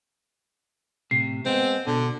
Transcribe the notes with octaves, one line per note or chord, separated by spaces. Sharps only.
A2 C3 C7
G#3 B3 C4
B2 D3